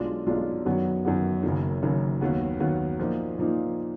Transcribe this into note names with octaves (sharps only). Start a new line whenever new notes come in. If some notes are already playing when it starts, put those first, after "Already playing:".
Already playing: B1 B2 G#3 D4 F4
B1 B2 G#3 D4 F4
F#2 D#3 F#3 B3
F#2 D#3 F#3 B3
F#1 F#2 D#3
F#1 F#2 D#3
D#2 D#3 F#3 B3
D#2 D#3 F#3 B3
A#2 F3 A#3 D#4
A#2 F3 A#3 D#4